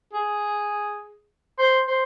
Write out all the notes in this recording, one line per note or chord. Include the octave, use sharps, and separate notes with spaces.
G#4
C5
C5